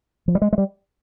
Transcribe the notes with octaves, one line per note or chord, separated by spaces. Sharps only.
F3
G3
G#3
G#3
G3